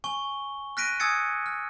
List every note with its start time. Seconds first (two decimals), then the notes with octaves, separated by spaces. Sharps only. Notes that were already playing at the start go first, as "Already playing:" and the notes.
0.04 G#5 C#6 G7
0.77 F6 F#6 A#6 B6 D7 D#7
1.00 G#5 D#6 E6 G#6 A6 C#7
1.46 F6